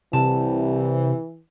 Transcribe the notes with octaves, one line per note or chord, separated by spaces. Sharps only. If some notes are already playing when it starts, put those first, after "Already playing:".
C2 C3 E3 A5